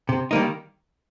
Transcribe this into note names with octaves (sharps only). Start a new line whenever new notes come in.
C3
D#3 G3 A#3 D#4